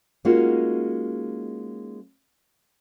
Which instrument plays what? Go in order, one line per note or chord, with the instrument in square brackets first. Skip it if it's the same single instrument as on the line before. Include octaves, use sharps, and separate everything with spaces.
[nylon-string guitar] G#3 A#3 C#4 D#4 F4 F#4